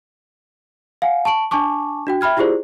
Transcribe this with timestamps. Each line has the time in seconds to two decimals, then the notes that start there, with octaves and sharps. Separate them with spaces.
1.02 F5 F#5 G#5
1.25 A5 C#6 D7 F#7
1.51 D4 G#5 A5 C#6 D6
2.07 D4 F#4 G5
2.21 E5 G5 B5 F6 G#6
2.37 E4 F4 G4 G#4 C5 D5